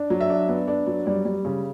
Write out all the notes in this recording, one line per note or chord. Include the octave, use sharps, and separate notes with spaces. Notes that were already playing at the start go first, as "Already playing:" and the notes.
Already playing: D4
F#3
E5
D4
B3
D4
F#3
G3 D5
G3
C#3